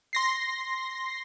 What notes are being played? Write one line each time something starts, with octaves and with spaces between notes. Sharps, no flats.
C6 A#6 C7